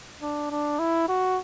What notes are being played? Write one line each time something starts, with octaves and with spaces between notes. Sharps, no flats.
D4
D4
E4
F#4